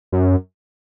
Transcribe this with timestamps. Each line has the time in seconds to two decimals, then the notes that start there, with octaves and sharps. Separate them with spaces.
0.12 F#2